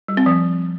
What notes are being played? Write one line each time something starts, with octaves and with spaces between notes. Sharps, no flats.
G3
C4
F3